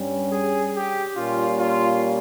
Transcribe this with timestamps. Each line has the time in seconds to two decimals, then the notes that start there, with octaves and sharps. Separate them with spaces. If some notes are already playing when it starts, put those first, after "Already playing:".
Already playing: G2 G3 C#4
0.32 G#4
0.73 G4
1.16 A#2 G3 A#3 C#4 F4
1.58 F4